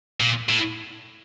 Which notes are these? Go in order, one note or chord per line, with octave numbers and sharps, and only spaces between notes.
A#2
A2